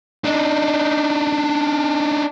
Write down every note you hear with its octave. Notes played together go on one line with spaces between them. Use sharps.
D4 D#4